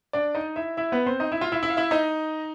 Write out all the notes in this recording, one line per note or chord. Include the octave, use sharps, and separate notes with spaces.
D4 D5
D#4 D#5
E4 E5
E4 E5
B3 B4
C4 C5
D#4 D#5
E4 E5
F4 F5
E4 E5
E4 E5
F5
E4 E5
D#4 D#5